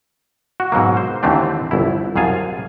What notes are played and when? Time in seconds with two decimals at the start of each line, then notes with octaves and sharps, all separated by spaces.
0.60 F#4
0.72 G#2 B2 F#3 A#3
0.97 C5
1.23 D#2 D3 E3 A3 C4 D4
1.71 G1 C2 E4
2.16 C2 F#2 G#4 F5 G#5 A5